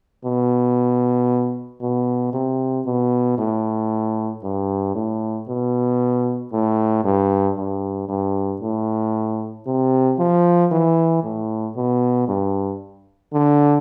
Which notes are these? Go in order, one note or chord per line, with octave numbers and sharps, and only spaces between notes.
B2
B2
C3
B2
A2
G2
A2
B2
A2
G2
G2
G2
A2
C3
F3
E3
A2
B2
G2
D3